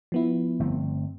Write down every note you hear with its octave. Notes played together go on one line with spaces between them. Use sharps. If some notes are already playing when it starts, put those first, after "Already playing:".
F3 B3 E4
G1 A3 C4